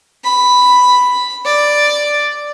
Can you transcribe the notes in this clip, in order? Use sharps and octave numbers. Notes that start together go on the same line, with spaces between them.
B5
D5